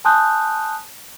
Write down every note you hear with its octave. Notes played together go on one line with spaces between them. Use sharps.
G#5 A5 C6 D#6 F#6 G6